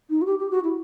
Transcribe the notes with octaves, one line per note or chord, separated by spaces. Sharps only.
D#4
F#4
G4
G4
F#4
E4